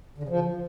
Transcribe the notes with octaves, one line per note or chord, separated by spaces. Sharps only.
D3
C#3
F3